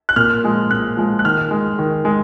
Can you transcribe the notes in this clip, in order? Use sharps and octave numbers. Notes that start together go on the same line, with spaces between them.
F#6
A#2 F6
F3 G#3
A#2 F#6
F3 G#3
F#6
D#3 F6
G#3
D#3
G#3